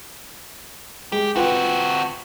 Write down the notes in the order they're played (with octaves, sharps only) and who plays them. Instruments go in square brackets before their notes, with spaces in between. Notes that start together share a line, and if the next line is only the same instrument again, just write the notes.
[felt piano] G#3 [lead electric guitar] G4
[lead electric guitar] C4 F#4 [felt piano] F4 B4 G5